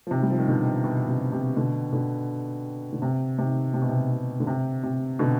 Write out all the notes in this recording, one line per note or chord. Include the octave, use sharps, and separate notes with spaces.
F3
C3 D#3
G3
F3
D#3
B2 D3
B2
C3
C3
B2 D3
B2 D3
D3
C3
C3 D#3
C3
B2
C3
C3
D3
C3
C3
B2 D3